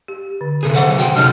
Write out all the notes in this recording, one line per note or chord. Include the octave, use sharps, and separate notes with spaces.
G4
D3
C3 G#4 A4
D#3 F#3 C#5 F#5
F#4 G5 C6
F#3 C#4 D#4 A4 C#5 F6